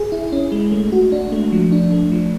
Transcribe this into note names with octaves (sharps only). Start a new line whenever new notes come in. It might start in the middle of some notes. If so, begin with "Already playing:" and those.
Already playing: G#4
E4
C#4
G#3
A3
F#4
D4
A3
F3
D4
A3
F3